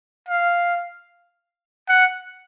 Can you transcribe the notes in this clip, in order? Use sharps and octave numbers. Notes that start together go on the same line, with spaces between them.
F5
F#5